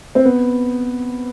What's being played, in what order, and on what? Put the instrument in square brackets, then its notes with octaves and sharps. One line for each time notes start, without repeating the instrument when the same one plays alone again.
[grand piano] C4
B3